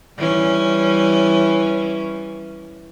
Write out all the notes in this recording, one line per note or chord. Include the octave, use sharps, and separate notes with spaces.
E3 G3 C#4